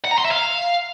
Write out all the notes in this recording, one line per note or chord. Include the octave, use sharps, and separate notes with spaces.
F#5
A#5
C6
E5
F5